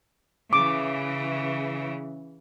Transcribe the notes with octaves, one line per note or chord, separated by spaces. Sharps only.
C#3 E3 D6